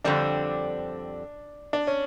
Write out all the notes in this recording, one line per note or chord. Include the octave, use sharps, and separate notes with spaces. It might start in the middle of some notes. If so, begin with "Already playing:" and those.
F2 D3 G3 C4 D4
D4
C#4